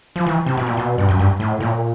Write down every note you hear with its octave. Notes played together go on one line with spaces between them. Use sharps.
F3
E3
C3
B2
A#2
B2
G2
F#2
G2
A2
A#2